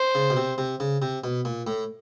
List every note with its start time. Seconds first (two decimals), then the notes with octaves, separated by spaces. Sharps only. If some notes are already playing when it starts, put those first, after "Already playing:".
Already playing: C5
0.15 C#3
0.30 B2
0.37 C3
0.58 C3
0.80 C#3
1.02 C3
1.24 B2
1.45 A#2
1.67 A2